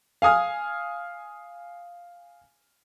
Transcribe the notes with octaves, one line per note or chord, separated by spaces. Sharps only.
F5 G#5 D#6 F6